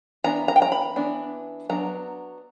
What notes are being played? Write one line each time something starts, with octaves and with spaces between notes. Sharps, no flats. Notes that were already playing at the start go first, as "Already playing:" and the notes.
E3 B3 D4 A#5
A#5
G5
A#5
B5
E3 B3 D4
F#3 B3 D4 A#5